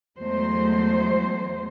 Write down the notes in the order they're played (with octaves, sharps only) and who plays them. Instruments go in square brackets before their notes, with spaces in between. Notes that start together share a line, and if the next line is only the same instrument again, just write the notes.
[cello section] E2 F#3 G#3 A3 C5